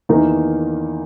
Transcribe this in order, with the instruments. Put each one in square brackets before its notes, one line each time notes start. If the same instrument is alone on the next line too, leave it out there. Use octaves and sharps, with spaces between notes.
[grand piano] E2 D#3 A#3 D#4